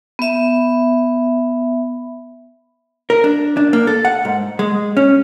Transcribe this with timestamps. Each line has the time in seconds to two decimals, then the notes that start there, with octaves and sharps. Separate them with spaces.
0.19 B3 E5
3.10 A#4
3.24 D4
3.57 D4
3.73 A#3
3.87 A4
4.05 F#5
4.25 G#2
4.59 G#3
4.97 C#4